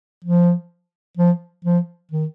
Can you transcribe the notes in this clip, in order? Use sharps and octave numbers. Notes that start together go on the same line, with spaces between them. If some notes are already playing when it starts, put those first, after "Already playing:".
F3
F3
F3
D#3